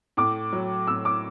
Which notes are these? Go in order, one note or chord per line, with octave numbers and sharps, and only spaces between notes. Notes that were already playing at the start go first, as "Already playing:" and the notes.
A2 D6
F#3
A2 E6
D6